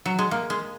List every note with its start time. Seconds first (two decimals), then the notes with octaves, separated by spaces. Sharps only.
0.05 F#3
0.19 G#3
0.31 A#3
0.50 G#3